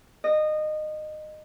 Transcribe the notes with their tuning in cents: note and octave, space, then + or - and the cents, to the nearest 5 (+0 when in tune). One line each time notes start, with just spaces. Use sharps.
D#5 -20